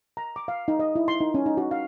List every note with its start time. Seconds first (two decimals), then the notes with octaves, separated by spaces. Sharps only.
0.17 A#5
0.36 D6
0.48 F5
0.68 D#4
0.79 D#5
0.95 E4
1.08 C6
1.20 D#4
1.34 C#4
1.46 D#4
1.57 F#4
1.71 F5